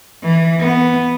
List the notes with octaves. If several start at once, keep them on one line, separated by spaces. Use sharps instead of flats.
E3
B3